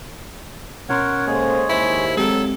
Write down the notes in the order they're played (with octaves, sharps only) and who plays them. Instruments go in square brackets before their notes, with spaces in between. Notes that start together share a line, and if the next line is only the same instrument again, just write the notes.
[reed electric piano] B2 C#4 C6 [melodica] A#4 C#5 F#5
[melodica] G#3 G#4 C#5 [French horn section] A#3 A4 C5
[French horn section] D#2 [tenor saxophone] E4 [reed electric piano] C5 B5
[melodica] F#3 [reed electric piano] G#3 C4 G4 [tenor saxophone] A4